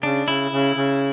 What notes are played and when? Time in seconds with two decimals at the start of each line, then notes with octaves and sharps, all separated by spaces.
0.02 C#3 D4
0.27 C#3 E4
0.51 C#3
0.76 C#3